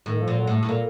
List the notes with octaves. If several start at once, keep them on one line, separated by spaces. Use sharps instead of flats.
A2 D#3
F3
A#2
F#3
A2
A3
A2
A#2 A#3